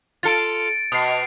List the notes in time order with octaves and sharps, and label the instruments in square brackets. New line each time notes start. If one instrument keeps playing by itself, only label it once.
[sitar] F4 A4 [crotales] A6 C#7 D7
[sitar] B2 [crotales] D#6 C7